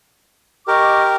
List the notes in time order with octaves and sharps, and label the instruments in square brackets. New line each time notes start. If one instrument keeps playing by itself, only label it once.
[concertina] G4 A#4 [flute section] D#5 C#6 D6